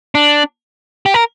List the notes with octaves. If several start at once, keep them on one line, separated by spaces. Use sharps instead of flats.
D4
G4
A#4